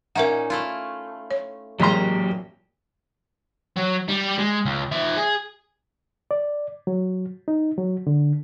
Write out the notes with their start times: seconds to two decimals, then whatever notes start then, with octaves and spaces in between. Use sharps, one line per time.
0.15 A#2 C#4 D#4 A#4 E5 F#5
0.50 A3 E4 F4
1.31 C#5
1.80 A1 A#2 F#3 G#3 A#3 G4 A#5 C6
3.77 F#3
4.09 G3
4.38 G#3
4.65 C#2
4.92 F3 E5
5.17 G#4
6.31 D5
6.87 F#3
7.48 D#4
7.78 F#3
8.07 D3